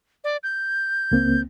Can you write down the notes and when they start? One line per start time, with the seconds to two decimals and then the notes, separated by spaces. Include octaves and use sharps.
0.24 D5
0.43 G6
1.11 C#2 A#3 C4